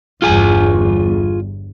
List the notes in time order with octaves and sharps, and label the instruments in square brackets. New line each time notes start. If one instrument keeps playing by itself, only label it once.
[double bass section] G1 E2 G2 [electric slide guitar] F4 G#4 G#5